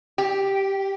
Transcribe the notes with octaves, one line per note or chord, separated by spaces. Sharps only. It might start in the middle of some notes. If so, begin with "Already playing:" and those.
G4